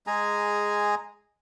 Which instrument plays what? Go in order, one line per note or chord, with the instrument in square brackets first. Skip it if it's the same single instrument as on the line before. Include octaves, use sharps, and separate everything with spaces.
[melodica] G#3 G#4 G#5 A#5